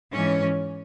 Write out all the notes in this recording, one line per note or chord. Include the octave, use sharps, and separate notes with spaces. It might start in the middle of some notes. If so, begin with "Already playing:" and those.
G#2 E3 C#4